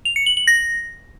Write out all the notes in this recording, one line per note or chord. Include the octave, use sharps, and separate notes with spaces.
F7
C#7
F#7
F#7
A#6